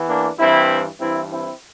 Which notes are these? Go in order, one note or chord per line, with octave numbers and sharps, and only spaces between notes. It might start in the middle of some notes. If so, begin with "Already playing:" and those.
Already playing: E2 E3
A#3 D4
G2 E3 C4 E4
G2 E3 C4 E4
C4 E4